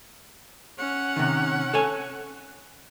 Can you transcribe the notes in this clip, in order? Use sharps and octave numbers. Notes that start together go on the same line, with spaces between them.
C#4 F#5
C3 D#3
A4 C#5 G#5